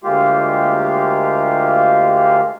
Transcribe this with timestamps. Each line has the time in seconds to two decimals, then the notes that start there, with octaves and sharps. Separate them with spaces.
0.04 D2 G#3 A#3 F4 G4 F5